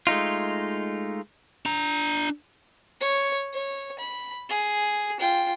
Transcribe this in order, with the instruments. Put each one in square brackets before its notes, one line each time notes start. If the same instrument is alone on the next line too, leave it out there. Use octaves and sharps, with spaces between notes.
[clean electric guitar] G#3 A3 D#4 F4
[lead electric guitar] D4 A#5
[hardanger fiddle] C#5
C#5
B5
G#4
F4 G5